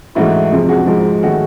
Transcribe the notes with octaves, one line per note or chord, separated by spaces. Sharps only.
G#2 E3 A3 E4 F#4
F2 C3 F3 G#3
F#4 G#4
G#2 F3 G#3
D#3 F#3 A3 F#4 G#4